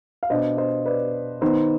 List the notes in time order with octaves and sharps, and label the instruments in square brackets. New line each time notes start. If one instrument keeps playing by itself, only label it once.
[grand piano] F5
B2 B3 D4 C5 D#5
C5 D#5
B4 D5
D#3 B3 D#4 C5